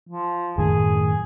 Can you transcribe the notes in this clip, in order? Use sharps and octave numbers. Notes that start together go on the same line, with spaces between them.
F3
F#2 A2 D#3 G#4